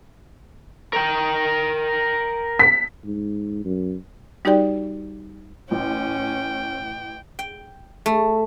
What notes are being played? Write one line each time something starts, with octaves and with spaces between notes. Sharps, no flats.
A#4 G5
B6
G#2
F#2
G3 D#4 F#4 G4 D5 G5
A1 C#4 G5
G5
A3